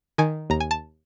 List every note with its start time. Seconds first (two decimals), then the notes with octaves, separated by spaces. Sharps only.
0.18 D#3 G#5
0.50 D#2 A#5
0.60 G#5
0.71 A5